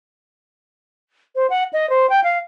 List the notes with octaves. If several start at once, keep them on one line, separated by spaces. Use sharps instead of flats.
C5
F#5
D#5
C5
G5
F5